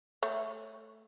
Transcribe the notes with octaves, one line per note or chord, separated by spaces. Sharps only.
A3 C#5